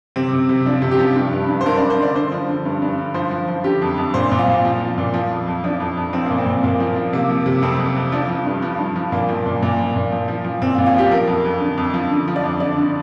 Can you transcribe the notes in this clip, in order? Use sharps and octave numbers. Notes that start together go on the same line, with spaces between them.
C3 C4
C3
C3
F3 D4
C3
G4
F3
G2
G2
G2
C5
G2 A#4
D5
G2
C5
D3 D5
D3 C5
F3
D3
G2
G2
D3
F3 C5
F3
F3
D3 G4
F2
F2
A#2 C5
A#2
F4
A#2
F3
F3
A#2
F3
F2
F2
F3 D4
F2
F2
F3 C4
A#2 A#3
C4
A#2
A#2 A#3
F3
F3
C3 A#3
F3
C3
F2 C4
F2
F2
F3 D4
F3
G2
F3
G2
F3
A#2 A#3
F3
A#2
A#2
F3
A#2
F3
F3
F3
A#2 C4
F4
A#2
F4
F3 G4
F3 A#4
F2
F2
D3
F2
F3
D3
F3
D5
F2
D3 D5
D3